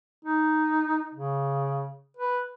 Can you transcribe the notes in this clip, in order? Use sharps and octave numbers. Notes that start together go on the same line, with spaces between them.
D#4
C#3
B4